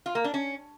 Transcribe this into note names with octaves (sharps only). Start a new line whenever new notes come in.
F4
A#3
D4
C#4